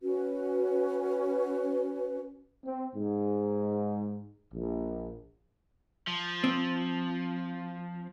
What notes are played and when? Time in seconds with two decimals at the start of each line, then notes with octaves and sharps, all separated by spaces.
0.03 C#4 F#4 B4
2.64 C4
2.95 G#2
4.52 A#1
6.07 F3
6.44 C4